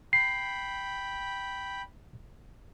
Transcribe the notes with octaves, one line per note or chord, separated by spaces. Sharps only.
G5 B5 C7